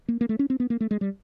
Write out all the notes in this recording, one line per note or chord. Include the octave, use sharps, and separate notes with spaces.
A#3
A#3
A3
C#4
C4
B3
A#3
A3
G#3
G3